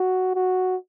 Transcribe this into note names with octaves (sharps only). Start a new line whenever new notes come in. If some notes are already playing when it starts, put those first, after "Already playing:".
Already playing: F#4
F#4